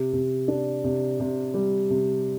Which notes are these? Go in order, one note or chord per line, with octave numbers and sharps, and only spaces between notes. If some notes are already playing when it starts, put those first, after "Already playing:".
Already playing: C3
C3
D4
C3
C3
G3
C3